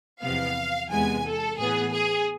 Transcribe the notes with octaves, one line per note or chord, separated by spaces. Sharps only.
E2 C3 F3 B3 F5
E2 C3 G#3 B3 G#5
A4
A2 E3 B3 G#4
G#4